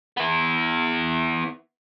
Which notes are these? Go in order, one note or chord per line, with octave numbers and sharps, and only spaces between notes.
B3 E4